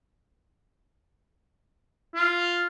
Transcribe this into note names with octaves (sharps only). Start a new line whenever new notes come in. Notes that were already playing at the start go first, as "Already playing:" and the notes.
F4